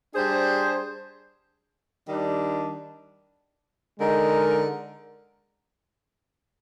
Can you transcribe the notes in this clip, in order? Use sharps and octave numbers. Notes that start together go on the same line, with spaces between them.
G3 D4 G#4 C5
D#3 G3 D4
D3 G#3 D#4 A#4